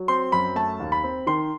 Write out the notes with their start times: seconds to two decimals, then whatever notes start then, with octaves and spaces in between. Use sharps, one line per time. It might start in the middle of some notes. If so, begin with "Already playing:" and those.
Already playing: F#3
0.08 C4 C6
0.32 F#2 B5
0.56 A3 A5
0.80 D#2
0.92 B5
1.04 C4
1.27 D#3 C6